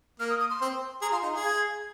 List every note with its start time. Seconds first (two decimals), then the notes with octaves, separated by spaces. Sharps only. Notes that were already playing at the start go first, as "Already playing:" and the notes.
0.20 A#3 F6
0.30 D#6
0.40 D#6
0.50 C6
0.61 C4
1.02 G#4 A#5
1.12 F4 C6
1.23 D#4 A#5
1.33 G#4 F5
1.44 G#6